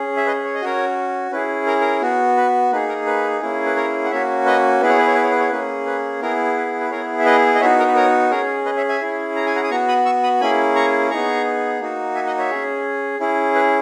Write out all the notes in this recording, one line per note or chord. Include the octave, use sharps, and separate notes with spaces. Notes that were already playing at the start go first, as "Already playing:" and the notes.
Already playing: C#4 G#4
E5
B4 D#5
C#5
D#5
C#4 F#4 A#4 C#5
C#4 E4 G#4 B4
A#4
A#4
B3 F#4
B4
A#3 D#4 G#4 B4
A#4
B4
A#3 C#4 E4 G#4
B4
A#4 C#5
F#5
A#3 C#4 F#4 C#5 E5
B4 D#5
B3 E4 G#4 B4
C#5
B4
C#5
B4
C#5
B4
C#5
A#3 C#4 G#4 B4
B4
B3 E4 G#4 A#4
B4
B4
B3 E4 G#4 A#4 C#5
E5
B4 D#5
D#5
B3 D#4 F#4 C#5 E5
A#4
B4
A#4 C#5
C#4 G#4 A#4 C#5
B4 D#5
C#5 E5
E5 G#5
C#4 E4 G#4
A#5
G#5
F#5 A#5
D#6
B3 F#4 A#5 C#6
B5 D#6
C#6 E6
B5 D#6
A#3 C#4 E4 G#4 G#5 B5
A#5 C#6
B3 D#4 G#4 A#5 C#6
A#3 D#4 F#4
E5 G#5
D#5 F#5
C#5 E5
C#4 G#4
C#4 E4 G#4
B4